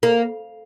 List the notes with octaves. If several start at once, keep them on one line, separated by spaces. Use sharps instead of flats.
A#3